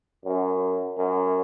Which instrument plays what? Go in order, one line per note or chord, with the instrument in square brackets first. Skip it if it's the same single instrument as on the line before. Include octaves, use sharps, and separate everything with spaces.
[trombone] F#2
F#2